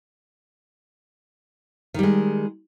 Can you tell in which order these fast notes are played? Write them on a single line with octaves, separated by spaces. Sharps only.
D#3 G3 G#3